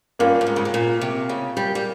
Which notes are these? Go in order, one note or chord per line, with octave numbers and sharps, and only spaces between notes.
G2 A#3 C#4 F4
G2
G#2
C#3
C3
A#2
C3
C#3
G3
G3